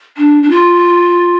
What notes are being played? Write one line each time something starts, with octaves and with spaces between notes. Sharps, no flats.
D4
D4
F4